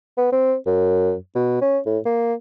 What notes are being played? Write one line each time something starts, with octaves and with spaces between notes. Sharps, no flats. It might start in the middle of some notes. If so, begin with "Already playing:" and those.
B3
C4
F#2
B2
C#4
A2
A#3